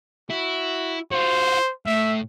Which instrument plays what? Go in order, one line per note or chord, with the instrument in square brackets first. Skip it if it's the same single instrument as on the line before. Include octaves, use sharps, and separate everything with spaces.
[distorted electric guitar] E4 [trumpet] F#4
[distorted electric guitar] F4 F#4 [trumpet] C5
[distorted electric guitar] A2 [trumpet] E5